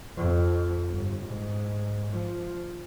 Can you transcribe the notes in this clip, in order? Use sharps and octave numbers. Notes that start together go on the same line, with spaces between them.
F2
G1
G#2
F3